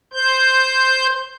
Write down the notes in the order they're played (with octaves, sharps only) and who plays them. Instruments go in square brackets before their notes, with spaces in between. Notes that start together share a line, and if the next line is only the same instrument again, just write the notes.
[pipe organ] C5 G6